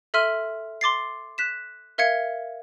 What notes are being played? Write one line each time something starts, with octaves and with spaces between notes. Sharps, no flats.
A4 E5 C6 F6 D#7
C6 D6 A6 C7
F#6 B6 E7
A#4 E5 F5 G#6 C#7